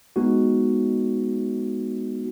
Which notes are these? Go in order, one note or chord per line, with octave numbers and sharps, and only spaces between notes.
G#3 B3 D#4 F#4